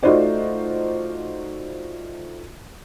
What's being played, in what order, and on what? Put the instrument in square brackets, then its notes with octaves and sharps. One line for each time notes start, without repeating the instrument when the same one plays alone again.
[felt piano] A3 D#4 F4 F#4 C5 D5